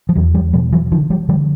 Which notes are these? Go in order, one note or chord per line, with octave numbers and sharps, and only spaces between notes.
F3
E2 E3 F#3
F3 G3
B2 F3 G3
E3 F#3
D3 D#3 F3
F3 G3
D3 F3 G3